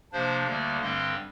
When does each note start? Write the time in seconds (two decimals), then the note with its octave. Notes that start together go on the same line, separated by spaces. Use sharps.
0.12 C3 F3 A#3 D4 C5
0.47 D2 D3 G3 A#3 D5
0.81 G2 D3 G3 C4 D#5